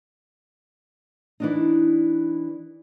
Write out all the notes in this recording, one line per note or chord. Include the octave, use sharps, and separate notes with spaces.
E3 D4 D#4